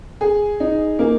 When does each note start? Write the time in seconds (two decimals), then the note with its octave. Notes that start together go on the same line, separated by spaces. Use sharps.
0.21 G#4
0.60 D#4
0.99 A#3